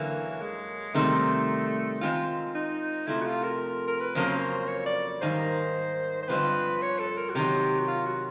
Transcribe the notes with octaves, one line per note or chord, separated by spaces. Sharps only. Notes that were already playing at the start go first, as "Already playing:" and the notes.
Already playing: F#2 D3 E3 F#3 A#3
G#3
C3 D#3 G3 A3 C4
D#3 G#3 C4 F4
D#4
F2 C3 F3 A3 E4
F#4
F4
A#4
A#4
B4
F2 C#3 F#3 A#3 C5
C#5
D5
G#2 D#3 G3 A#3 C5
C5
G2 D3 F3 G#3 C4 B4
C#5
A4
A#4
F#4
C3 D#3 F#3 G4
F#4
F4
F#4